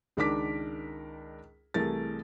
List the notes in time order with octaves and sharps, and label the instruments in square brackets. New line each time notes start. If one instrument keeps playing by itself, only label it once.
[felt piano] C#2 D#3 D4 A#4 D6 B6
C2 E3 A3 G#4 A#4 A6